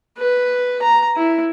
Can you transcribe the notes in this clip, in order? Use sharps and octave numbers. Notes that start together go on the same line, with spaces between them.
B4
A#5
E4